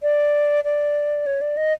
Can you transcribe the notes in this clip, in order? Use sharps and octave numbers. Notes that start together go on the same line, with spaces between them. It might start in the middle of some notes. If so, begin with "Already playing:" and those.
D5
D5
C#5
D5
D#5